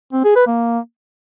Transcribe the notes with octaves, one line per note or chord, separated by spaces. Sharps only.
C4
G#4
B4
A#3